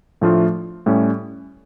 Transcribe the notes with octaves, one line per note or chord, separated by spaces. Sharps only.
A2 F3 A3 D4 F4
A2 G3 C#4